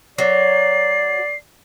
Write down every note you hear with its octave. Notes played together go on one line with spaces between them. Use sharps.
F#3 D5 C7